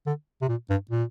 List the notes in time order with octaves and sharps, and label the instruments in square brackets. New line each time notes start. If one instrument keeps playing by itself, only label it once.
[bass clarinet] D3
C3
A#2
G2
A#2